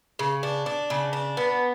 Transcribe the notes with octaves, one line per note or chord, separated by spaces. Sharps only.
C#3
D4
D4
C#3
D4
B3